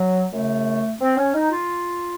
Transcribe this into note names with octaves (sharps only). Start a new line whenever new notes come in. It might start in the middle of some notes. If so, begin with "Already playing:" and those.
Already playing: F#3
F#2 C#3 A3
C4
C#4
D#4
F4